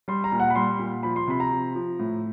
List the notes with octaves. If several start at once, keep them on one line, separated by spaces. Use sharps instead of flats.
G3 C6
A#5
A#2
F#5
B5
G3 C6
A#2
F3 B5
C6
C3 B5
A#5
F3
F3
A2